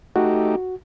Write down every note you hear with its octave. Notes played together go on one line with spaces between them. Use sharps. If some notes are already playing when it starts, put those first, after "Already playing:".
A3 D#4 F#4 G4